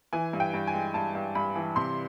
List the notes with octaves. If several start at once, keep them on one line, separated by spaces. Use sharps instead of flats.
E3 G#5
G2
G5
G2
G#5
G#3
G2 A5
G2
G2 B5
E3
C3 C6